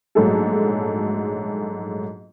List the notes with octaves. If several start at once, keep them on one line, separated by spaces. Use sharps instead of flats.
A#1 G#2 F#3 A3 G#4 A4